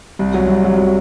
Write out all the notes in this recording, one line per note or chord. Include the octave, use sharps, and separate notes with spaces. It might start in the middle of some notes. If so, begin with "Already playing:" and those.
C2
F#3
C2
F#3
F#3